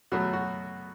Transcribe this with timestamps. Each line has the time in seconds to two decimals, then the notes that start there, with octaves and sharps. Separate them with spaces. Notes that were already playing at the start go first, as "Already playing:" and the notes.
0.12 B2 F#3 A3 F#4
0.33 F#4